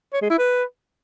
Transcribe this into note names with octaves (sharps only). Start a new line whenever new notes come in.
C#5
G#3
E4
B4